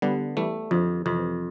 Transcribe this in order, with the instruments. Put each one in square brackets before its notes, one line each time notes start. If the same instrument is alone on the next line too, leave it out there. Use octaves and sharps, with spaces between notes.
[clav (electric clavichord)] D3 [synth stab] G3 B3
[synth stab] E3 G3 [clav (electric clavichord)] A3
[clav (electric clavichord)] F2 [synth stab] D3 F3
[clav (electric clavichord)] F2 [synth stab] C3 E3